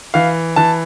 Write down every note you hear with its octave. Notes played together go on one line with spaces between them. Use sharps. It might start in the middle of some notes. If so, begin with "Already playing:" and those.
E3 F5
E3 A5